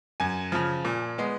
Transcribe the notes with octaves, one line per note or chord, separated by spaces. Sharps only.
F#2 G#5
C#3 F3
A#2
G#3 B3